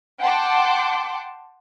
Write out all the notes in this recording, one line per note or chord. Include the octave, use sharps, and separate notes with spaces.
F#5 G5 A5 C6 D6